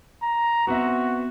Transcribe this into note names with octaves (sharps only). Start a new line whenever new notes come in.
A#5
B3 C4 F#4 E5